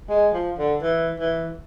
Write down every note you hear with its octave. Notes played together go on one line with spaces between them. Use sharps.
G#3
F3
D3
E3
E3